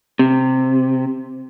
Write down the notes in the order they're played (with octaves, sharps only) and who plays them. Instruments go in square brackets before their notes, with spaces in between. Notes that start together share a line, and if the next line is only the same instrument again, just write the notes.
[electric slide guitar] C3